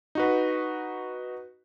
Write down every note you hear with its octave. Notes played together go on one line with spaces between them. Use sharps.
D#4 F#4 B4